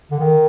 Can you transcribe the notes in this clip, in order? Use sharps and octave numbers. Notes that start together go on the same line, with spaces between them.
D3
D#3